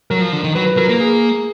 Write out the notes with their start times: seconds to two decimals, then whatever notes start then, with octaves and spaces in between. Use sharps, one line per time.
0.10 F#3 A#4
0.21 F3
0.33 D3
0.44 D#3
0.55 F#3 B4
0.66 B4
0.77 F#3 A#4
0.89 A#3 A#4
1.00 G#4